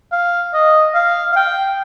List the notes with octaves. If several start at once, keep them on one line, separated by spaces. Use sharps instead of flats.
F5
D#5
F5
F5
G5